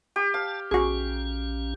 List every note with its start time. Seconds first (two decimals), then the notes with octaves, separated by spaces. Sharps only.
0.16 G4
0.34 F5 A5
0.71 A#1 C#4 F#4 G#4